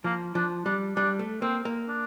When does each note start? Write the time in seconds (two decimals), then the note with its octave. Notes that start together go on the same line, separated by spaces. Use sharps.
0.04 F3 A#3
0.35 F3 D4
0.66 G3 D4
0.96 G3 D4
1.19 A3
1.42 A#3 C4
1.65 A#3
1.88 D4